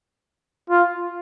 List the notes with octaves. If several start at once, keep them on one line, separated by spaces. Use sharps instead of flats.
F4